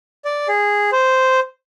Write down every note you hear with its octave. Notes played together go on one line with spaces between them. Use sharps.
D5
G#4
C5